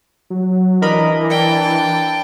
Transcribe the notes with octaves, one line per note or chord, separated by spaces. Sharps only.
F#3
E3 D4 A#4 D#5 B5
D5 G5 A5